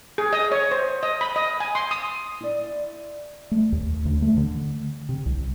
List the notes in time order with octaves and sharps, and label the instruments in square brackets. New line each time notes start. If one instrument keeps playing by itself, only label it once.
[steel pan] G#4
D#5
C#5
C5
D#5
B5
D#5
G#5
C6
D#6
[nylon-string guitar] E4 D5
[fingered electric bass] A3
D#2
D2
A3
D3
C3
C2